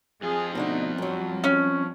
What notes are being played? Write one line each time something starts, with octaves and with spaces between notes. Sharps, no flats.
F2 F4 G#4
B2 D3 A3 D#4
F#2 F#3 G3
C#4